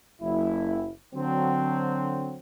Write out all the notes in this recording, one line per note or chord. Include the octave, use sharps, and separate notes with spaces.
F#1 E4
D3 F#3 C4